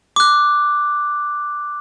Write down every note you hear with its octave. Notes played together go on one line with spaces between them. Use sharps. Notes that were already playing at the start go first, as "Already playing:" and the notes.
D6 F#6